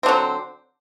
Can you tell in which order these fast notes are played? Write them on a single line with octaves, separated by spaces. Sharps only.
C4 D3 F#3